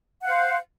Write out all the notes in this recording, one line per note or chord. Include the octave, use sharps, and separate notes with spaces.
C5 F5 F#5